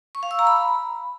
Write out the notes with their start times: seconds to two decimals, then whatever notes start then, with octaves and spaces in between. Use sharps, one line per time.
0.15 C#6
0.23 F5
0.31 E6
0.39 A#5
0.47 B5